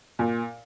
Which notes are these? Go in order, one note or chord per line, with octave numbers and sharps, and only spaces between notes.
A#2